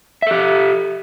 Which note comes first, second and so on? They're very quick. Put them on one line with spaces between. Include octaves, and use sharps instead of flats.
E5 A4 G4